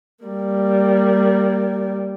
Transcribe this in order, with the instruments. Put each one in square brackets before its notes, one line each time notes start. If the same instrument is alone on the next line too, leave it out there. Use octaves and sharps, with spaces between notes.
[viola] G3 A#3